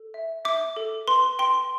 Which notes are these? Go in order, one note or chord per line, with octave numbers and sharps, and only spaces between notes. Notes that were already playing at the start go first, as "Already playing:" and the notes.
Already playing: A4
E5
E5 D6
A4
B4 C6
G5 C6